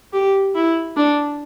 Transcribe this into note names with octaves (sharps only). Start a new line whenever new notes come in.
G4
E4
D4